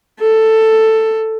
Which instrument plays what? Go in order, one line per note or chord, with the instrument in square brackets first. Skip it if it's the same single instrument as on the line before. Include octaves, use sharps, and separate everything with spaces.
[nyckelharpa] A4